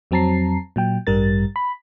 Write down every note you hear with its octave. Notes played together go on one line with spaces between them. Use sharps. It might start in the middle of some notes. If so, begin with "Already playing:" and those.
F2 F#3 C4 A5 A#5 C7
A#2 F#3 G5
A1 G2 G3 A#4 A6
B5